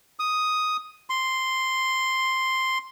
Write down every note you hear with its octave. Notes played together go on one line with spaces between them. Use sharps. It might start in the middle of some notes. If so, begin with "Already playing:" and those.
D#6
C6